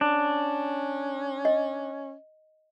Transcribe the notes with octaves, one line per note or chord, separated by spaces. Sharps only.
C#4 D4
D#5